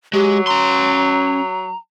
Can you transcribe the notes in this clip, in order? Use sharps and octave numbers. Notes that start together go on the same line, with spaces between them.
F#3 G#3 G4
C#4 A#5 C6